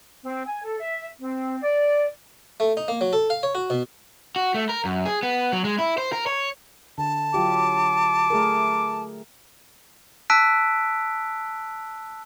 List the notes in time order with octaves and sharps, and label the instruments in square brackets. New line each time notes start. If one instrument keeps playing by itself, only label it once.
[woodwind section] C4
G#5
A4
E5
C4
D5
[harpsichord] A3
D#4
A#3
F#3
A4
F5
C#5
F#4
B2
[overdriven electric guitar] F#4
A3
A#4
F#2
G#4
B3
F#3
G#3
E4
C5
A#4
C#5
[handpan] D3 [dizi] A5
[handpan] F#3 F4 G4 [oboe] D6
[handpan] A3 G#4 A#4
[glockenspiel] A5 E6 F#6 B6 D7